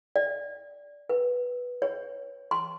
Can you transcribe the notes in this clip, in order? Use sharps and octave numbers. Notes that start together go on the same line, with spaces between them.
D5
B4
C#5
C6